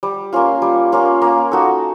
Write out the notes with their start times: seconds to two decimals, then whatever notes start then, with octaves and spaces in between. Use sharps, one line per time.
0.03 G3
0.33 A#3 C#4 F4
0.62 G3
0.92 A#3 C#4 F4
1.22 A#3
1.51 D#4 F#4 A4